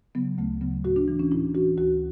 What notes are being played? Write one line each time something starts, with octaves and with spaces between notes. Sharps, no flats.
C#3 F#3 B3
D2 A3
C#3 F#3 B3
A2 F#4
D4
E3
C#4
A2 E4
E3 F#4
D2 F#4